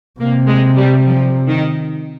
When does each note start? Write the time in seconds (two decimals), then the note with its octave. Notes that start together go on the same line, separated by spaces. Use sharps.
0.20 C3 A#3
0.48 G#3
0.77 G3
1.05 F3
1.47 D#3